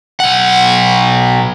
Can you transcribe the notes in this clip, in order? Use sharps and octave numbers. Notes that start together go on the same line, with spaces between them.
B1 F#5